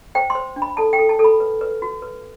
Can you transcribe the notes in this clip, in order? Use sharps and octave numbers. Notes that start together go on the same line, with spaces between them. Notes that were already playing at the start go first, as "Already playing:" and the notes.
C5 G5
C6
C5
D4
B5
A4 A5
G5
A4
A5
A4
B5
B4
B4
F#4
B4